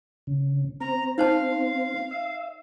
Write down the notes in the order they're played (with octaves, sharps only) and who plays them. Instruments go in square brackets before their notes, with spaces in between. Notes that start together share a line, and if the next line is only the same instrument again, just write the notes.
[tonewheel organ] C#3
[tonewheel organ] C4 [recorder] A#5
[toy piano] D#4 C5 A5 [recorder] F5
[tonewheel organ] E5